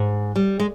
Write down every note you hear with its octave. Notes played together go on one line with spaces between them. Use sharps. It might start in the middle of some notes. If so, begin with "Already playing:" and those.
Already playing: G#2
G3
G#3